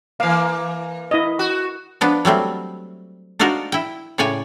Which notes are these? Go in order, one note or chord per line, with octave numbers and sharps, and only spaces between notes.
E3 A#3 F5
E4 D#5
F#4
F3 B3 D4
F#3 G3 A3 C4
D4 D#4 F4 F#4 A#4 C5
E4 G5
A2 C#3 C#5 D5 G5 G#5